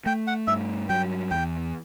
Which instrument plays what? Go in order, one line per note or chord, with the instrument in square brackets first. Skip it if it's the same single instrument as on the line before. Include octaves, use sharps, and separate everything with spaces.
[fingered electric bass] A3 [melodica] G5
[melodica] F#5
[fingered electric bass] G2 [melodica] E5
[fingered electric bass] F#3 [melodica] G5
[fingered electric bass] E2 [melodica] G5